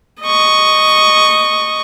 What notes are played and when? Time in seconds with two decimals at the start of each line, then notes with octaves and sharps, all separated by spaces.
0.22 D#5 C#6